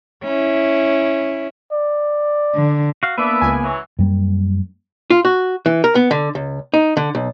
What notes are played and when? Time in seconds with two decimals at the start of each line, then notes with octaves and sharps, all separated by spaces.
0.24 C#4 E4
1.72 D5
2.54 D3
3.03 F#4 F5
3.18 A#3 B3 D4 B4 D5 E5
3.41 C#2 G#5
3.62 E3 F#3
3.99 F#2 G3 A#3
5.10 F4
5.25 F#4
5.66 E3
5.84 A#4
5.95 B3
6.11 D3
6.35 C#2
6.74 D#4
6.97 D3
7.15 B1